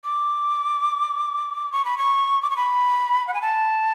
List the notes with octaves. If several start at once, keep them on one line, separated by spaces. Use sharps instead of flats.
D6
C#6
B5
C#6
D6
C#6
B5
F#5
G#5
A5